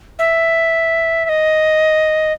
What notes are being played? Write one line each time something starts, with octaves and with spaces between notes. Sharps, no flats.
E5
E5
D#5